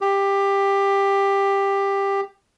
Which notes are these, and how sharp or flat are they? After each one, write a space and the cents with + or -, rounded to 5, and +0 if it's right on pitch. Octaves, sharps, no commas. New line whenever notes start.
G4 +15